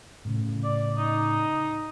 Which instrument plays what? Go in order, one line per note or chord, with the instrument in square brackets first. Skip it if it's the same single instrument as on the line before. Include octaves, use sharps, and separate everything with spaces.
[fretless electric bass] A2 C#3
[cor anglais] D5
D#4